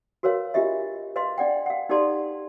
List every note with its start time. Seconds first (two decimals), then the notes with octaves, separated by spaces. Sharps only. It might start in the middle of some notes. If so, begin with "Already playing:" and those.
0.23 F#4 A#4 B4 C#5 F5
0.54 D4 F4 G4 D#5 E5
1.16 B4 D#5 F5 C6
1.38 D4 D5 F#5 G5
1.66 F5 F#5
1.89 D#4 G4 A4 D5 A5 C6